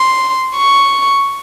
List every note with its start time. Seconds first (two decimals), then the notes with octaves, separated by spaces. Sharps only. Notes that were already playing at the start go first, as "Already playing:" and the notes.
Already playing: C6
0.56 C#6